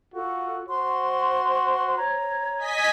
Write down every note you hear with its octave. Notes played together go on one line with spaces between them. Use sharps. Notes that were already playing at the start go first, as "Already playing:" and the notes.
F4 F#4 A4
F#4 C5 C6
C#5 A#5
D#5 G#5 B6